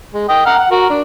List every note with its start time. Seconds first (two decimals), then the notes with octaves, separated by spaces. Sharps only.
0.13 G#3
0.29 D#5 G5
0.46 F#5 A#5 F6
0.59 F#5
0.71 F#4 A#4
0.90 D4